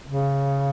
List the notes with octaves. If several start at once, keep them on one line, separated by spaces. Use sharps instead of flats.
C#3